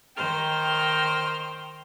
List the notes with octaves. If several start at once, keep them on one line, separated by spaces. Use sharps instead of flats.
D#3 C5 G5 F6